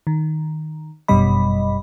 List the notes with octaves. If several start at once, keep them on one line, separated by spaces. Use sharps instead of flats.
D#3
G1 F#2 B2 G3 D#5 B5